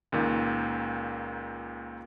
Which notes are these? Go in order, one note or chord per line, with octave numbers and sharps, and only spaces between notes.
C#2 A#2 D#3